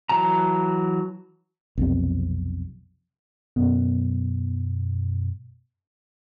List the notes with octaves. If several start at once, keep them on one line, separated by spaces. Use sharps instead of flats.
E3 F#3 A5 A#5
B1 F2 C3
F#2 B2